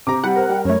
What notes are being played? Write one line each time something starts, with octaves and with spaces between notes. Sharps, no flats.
C3 A#5 D6
G3 F#5
A#4 C5
G3 G5
F#2 A3 C#5